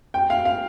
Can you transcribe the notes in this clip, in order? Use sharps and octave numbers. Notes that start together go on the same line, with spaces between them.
G5
F5
F5